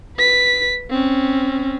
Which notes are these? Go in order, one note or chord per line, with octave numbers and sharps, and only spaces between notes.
B4 B6
C4 C#4